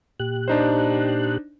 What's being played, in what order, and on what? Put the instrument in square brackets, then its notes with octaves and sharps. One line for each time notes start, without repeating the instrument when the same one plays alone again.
[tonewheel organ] A#2 G4 F#6
[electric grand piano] D4 D#4 C5